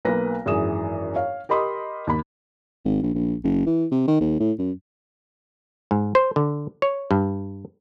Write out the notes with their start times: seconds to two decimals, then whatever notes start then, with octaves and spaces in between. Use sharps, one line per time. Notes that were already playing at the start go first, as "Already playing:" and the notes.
0.05 B1 A#3 B4 A#6
0.46 G#1 F#2 E3 G#4 D#6 E7
1.14 C#5 F5
1.49 G4 A#4 D#5 B5 C6 D#6
2.07 D#2 B5
2.85 G#1
3.03 A#1
3.15 A#1
3.44 F#1
3.66 E3
3.92 C3
4.08 D#3
4.21 D#2
4.40 A2
4.58 F#2
5.91 G#2
6.15 C5
6.36 D3
6.82 C#5
7.11 G2